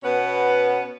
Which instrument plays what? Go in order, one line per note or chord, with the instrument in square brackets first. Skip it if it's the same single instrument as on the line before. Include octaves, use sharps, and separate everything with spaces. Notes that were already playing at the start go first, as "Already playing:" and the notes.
[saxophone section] B2 B3 C#4 B4 F#5